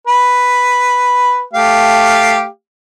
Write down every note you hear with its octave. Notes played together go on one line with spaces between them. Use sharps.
B4
A3 G4 F5